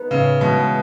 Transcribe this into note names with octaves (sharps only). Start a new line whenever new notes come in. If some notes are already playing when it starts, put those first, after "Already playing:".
Already playing: B3 D#4
A2 C#3
B2 E3 G#3 B3